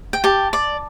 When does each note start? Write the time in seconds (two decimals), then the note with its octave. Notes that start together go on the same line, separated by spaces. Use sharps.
0.13 G5
0.24 G4 A5
0.53 D5